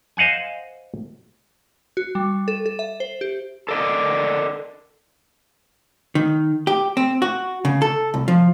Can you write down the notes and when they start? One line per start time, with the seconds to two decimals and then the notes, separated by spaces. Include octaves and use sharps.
0.17 C5 D#5 F5 F#5 G#5
1.97 F#4
2.15 G3
2.48 A4
2.66 A4
2.79 E5
3.00 C5
3.21 G4
3.69 A4 A#4 D5 D#5
6.15 D#3
6.67 G4
6.97 C4
7.22 F#4
7.65 C#3
7.82 A4
8.14 C2
8.28 F3